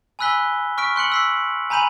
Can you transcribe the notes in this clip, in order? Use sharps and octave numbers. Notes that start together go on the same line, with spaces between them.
G#5 B5 E6 F#6 B6 G7
C#6 F6 B6 D7
C6 F#6 C#7 F#7
E6 B6 C7
G#5 A#5 B5 G6 D#7 F#7